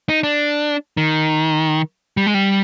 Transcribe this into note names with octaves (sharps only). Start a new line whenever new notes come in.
D#4
D4
D#3
G3
G#3
G3